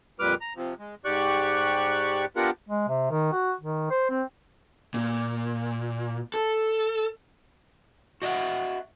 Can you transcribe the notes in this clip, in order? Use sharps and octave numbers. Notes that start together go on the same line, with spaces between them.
F2 A#2 G3 B4 D6 F6
A#5
C3 F3
G#3
G#2 G4 D5 C#6 F#6
B3 D4 F4 G4 A#4 F#5
G#3
C3
D#3
F#4
D#3
C5
C4
A#2
A4
F#4 D#5 E5 F#5